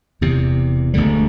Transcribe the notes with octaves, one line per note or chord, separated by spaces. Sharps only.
E1 E2 C3
E1 D2 D3 G3